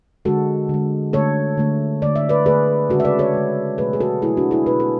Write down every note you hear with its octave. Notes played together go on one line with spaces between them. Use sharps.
D3 G#3 F#4 A4
D3 G#3
D3 A3 A4 C#5
D3 A3
D3 A3 D5
E5
B4 D5
D3 A3 G#4 B4
C#3 G#3 F#4 A4
E5
B4 D5
A4 C#5
C#3 G#3
B2 F#3 A3 G#4 B4
G#4
F#4 A4
B2 F#3 A3 E4 G#4
D4 F#4
E4 G#4
B2 G#3 B4
A4